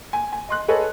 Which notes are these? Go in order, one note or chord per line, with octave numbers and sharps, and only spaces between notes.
G#5
G#5
D#5 C6 F#6
G#4 A4 B4 C#5 D#5